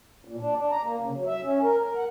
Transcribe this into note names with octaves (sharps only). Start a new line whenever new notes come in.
A#2
D4
D4
A#5
A#3
C#3
F#3
E5
C#4
A#4
A#4
F#5